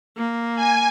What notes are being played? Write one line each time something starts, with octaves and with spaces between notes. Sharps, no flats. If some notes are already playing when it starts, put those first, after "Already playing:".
A#3
G#5